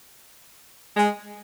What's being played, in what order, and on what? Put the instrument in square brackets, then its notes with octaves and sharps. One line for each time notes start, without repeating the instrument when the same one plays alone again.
[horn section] G#3